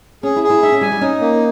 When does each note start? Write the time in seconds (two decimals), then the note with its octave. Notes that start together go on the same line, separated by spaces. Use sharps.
0.23 C#4 G#4
0.36 E4
0.43 G#4
0.50 E4
0.62 D#4 E5
0.72 C#4
0.81 G3 G#5
0.92 G3
1.01 C#4 D#4
1.21 A#3